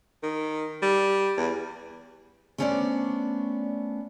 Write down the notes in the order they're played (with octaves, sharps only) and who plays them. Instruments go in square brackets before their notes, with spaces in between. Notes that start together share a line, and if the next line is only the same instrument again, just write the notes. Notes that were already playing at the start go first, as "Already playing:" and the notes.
[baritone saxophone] D#3
G3
E2
[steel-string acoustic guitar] A3 B3 C#4 D4 C5 D5